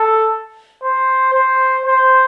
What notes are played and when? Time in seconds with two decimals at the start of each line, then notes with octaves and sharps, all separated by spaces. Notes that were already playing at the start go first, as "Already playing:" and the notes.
Already playing: A4
0.83 C5
1.34 C5
1.86 C5